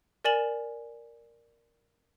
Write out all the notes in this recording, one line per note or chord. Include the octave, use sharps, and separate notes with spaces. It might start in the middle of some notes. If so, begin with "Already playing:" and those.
A#4 D5 G#5 A6 E7 F#7